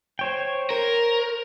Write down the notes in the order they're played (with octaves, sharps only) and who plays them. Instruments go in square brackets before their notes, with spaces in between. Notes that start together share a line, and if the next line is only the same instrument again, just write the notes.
[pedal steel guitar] C5 C#5 G5
[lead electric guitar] A#4